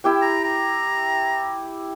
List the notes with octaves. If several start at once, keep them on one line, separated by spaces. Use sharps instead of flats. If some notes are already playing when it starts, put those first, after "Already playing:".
E4 G4 G5
A#5
A#5